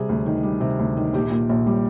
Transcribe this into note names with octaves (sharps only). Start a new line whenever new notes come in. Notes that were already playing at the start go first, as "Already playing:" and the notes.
Already playing: C3 G3 G#4
D2
D#3
G3
C3
D2
D#3
A#1 G4
A#2
A#1
G3